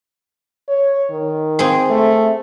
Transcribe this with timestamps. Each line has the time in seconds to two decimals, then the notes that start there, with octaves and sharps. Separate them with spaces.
0.69 C#5
1.11 D#3
1.59 C4 G#4
1.90 A3